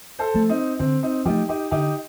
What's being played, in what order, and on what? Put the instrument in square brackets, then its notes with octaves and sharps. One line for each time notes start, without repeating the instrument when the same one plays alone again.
[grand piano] A4 C5
[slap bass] F3 A3
[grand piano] C4 D#4
[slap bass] D3 [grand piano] C4
[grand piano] C4 D#4
[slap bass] F3 A3 [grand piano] D#4 G4
[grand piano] D#4 G4
[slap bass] D3 [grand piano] D#4 G4